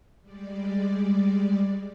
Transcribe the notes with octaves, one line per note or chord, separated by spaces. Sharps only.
G3 G#3 D5